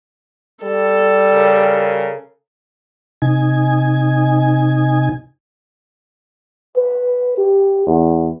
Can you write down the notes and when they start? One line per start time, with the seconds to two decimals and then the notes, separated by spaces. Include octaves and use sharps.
0.63 G3 A4
1.34 C#3 A#4
3.22 C3 D#4 G#5
6.77 B4
7.38 G4
7.87 E2